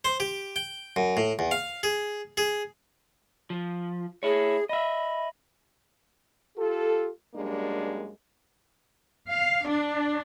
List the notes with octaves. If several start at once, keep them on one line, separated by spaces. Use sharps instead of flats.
C5
G4
G5
F#2
A2
E2
F5
G#4
G#4
F3
E4 G#4 C#5
D#5 E5 B5
F4 G4 A4
F#2 G3 G#3 A#3 D4
F5
D4